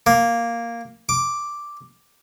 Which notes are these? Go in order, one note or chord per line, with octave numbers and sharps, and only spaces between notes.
A#3
D6